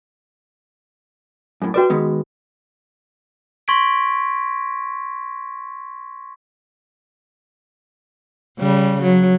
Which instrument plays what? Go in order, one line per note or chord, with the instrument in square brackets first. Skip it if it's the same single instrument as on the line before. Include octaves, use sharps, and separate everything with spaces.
[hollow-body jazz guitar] F#2 A2
[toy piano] F#4 B4 D6 [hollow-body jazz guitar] D5 G5
[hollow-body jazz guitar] D#3 G#3 B3
[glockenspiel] C6 C#6 G#6 A#6 B6 D7
[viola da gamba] C#3 G3
F#3